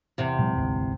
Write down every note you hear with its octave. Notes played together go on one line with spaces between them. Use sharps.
E2 C3
A#2 F#3 G#3
G#1 D2 G#2